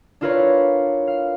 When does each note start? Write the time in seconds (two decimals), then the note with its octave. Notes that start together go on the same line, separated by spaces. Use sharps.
0.21 D4 E4 F4 A#4 B4 C#5
1.07 F5